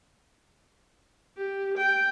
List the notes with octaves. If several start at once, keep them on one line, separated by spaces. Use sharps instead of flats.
G4
G5